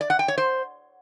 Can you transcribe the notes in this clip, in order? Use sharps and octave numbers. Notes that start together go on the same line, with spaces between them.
D5
F#5
G5
C#5
C5